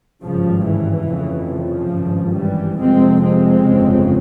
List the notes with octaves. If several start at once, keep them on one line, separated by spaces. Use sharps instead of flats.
G#1 G2 C#3 F3
E3
F1 F2 C#3
C#3 F3
G#1 G2
E3 G3
F1 F2 C3 G#3 C4
G#3 C4
G1 F2 C#3